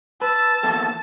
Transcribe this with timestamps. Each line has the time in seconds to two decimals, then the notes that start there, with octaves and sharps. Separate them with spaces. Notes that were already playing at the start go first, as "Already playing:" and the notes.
0.22 B4 A5 E6
0.63 E2 A#3 A4